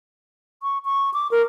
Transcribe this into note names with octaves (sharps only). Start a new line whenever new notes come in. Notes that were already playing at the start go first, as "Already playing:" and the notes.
C#6
C#6
D6
A#4